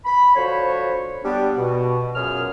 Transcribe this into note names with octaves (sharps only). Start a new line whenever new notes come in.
B5
D3 F3 F#4 C5 C#5
G3 B3 D4
B2
F#2 A#2 G#4 F6